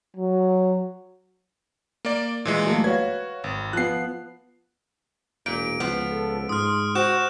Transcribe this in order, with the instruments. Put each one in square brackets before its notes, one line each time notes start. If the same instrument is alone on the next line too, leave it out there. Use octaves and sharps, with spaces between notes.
[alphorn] F#3
[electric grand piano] A#3 D5
A#2 E3 G#3
[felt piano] F#3 A3 A#3
[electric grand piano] F#4 G#6 [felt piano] B4 C#5 F5
[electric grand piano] G#1
[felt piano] F3 B3 [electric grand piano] F#6 C7
[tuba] E1 [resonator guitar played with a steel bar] A#2 [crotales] D7
[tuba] C#2 [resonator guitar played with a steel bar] F3 B3
[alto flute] A4
[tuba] G#2 [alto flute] C6 [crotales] D#6 F6
[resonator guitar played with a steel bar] F#4 [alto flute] C5 [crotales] F#6 E7